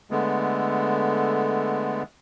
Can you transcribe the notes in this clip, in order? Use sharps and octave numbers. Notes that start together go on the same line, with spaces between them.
D3 G#3 A3 B3